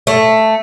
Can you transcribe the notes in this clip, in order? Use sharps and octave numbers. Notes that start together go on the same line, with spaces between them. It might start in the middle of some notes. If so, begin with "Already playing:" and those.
A3